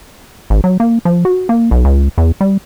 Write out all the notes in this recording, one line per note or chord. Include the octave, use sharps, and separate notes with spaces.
G#1
F#3
A#3
F3
F#4
A#3
B1
C#2
E2
G3